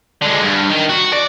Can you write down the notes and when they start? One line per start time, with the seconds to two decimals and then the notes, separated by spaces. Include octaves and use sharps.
0.21 D3 G#3
0.42 G2
0.69 D#3
0.89 F#4
1.13 D5